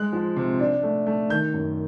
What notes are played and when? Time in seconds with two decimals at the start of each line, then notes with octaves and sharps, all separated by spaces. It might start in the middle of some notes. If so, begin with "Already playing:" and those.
Already playing: G#3 F#6
0.13 F3
0.36 C3
0.59 D4
0.83 A3
1.07 A3
1.30 D#3 G6
1.53 F#2